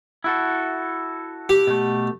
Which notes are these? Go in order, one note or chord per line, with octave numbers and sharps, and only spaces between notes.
E4 F#4 A4
G4
B2 A3